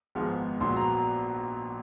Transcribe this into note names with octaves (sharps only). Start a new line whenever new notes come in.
G#1 G#2 F3 G#3 B3
A#1 A#2 F#3 B3 C6
A#5